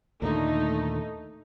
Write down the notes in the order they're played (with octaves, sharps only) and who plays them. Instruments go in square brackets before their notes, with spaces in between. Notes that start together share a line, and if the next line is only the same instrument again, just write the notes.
[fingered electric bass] D#2 A#2 D3 [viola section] A3 D#4